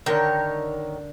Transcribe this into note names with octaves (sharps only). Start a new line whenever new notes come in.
D3 D#3 A#4 C#5 G6